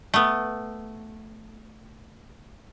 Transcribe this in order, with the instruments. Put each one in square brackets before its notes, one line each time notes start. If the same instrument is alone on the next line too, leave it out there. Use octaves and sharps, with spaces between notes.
[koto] A3 B3